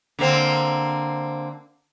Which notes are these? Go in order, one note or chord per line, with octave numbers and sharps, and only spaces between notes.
D3 A#3 C4